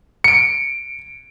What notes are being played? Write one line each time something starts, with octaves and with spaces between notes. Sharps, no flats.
C#7 D7